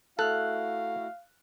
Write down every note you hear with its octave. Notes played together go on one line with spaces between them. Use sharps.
A3 E4 F#4 A4 F5 F6 F#6